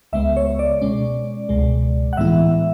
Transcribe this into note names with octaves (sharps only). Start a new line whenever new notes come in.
C#2 C#3 G#3 B3 E5
C#5
D5
B2 G#3 C#4
C#2 B2 G#3
F#5
A2 E3 G#3 B3 E4 E5